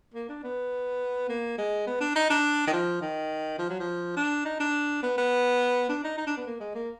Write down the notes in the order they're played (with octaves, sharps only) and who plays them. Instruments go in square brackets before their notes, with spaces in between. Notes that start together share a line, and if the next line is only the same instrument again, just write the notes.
[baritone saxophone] A#3
D4
B3
A#3
G#3
B3
D4
D#4
D4
D#3
F3
D#3
F3
F#3
F3
D4
D#4
D4
B3
B3
D4
D#4
D#4
D4
B3
A#3
G#3
A#3